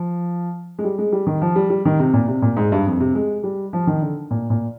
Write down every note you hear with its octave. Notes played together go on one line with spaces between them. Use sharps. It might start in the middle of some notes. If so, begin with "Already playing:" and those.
Already playing: F3
G#3
G3
G#3
G3
D#3
F3
G3
G3
D#3
C3
A#2
C3
A#2
G#2
G2
F2
C3
G#3
G3
F3
D#3
D3
A#2
A#2